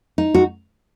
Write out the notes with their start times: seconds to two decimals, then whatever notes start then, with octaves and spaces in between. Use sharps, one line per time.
0.18 D#4
0.35 F#4